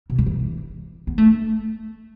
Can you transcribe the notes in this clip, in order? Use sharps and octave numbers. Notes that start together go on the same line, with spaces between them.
B2
G3
E3
B3
A3